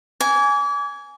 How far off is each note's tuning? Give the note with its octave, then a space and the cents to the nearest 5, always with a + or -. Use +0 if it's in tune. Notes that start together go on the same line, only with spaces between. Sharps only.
G#5 +0 D6 -35